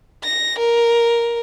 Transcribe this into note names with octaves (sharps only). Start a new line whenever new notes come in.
A#6
A#4